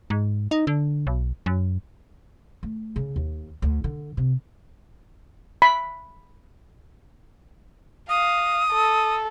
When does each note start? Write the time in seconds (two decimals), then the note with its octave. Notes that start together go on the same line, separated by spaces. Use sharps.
0.10 G#2
0.51 D#4
0.67 D3
1.07 B1
1.46 F#2
2.63 A3
2.96 C#3
3.16 D#2
3.62 D2
3.84 D3
4.17 C3
5.62 B5
8.09 F5 D#6
8.73 A4